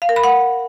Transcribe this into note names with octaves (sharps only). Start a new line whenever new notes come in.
F5
A#4
B5
F#5